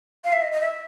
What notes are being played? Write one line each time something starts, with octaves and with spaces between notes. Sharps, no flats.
F5
E5
D#5
D#5
E5